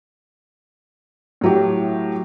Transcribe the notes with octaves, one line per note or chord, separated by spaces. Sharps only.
A2 F#3 G4